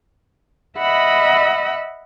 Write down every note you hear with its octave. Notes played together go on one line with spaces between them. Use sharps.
D#5 E5 F#5 B5 E6